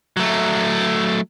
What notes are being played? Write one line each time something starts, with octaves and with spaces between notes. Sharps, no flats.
F#3 A3